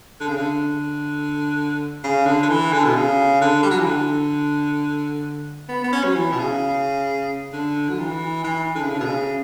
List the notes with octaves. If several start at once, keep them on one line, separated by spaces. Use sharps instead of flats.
D3
C#3
D3
C#3
D3
D3
E3
D3
B2
C#3
D3
G3
F#3
E3
D3
B3
B3
C#4
F#3
E3
B2
C#3
D3
F#3
E3
E3
D3
C#3
D3
B2
C#3